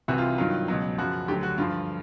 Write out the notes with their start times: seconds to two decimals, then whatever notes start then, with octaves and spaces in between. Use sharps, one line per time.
0.08 C2 C3 E3 F#4
0.18 F4
0.38 G2 D#3 F#3 F4
0.68 C#2 B2 F#3
0.98 F#2 C#3 F3 F#4
1.28 D2 D3 F#3 G4
1.43 F#4
1.58 G2 D3 F3 F4